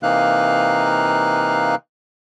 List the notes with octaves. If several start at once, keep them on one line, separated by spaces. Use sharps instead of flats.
C3 E3 A#3 D#4 F5 F#6